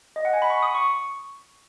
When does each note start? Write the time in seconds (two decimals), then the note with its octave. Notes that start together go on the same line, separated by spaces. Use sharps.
0.16 D#5
0.25 F#5
0.33 G#5
0.42 B5
0.50 C#6
0.63 D#6
0.75 C#6